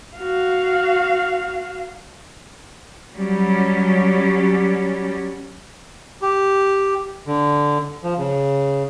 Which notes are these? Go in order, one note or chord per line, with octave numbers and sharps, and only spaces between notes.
F#4 F5
F#3 G3 C#4
G4
D3
F3
C#3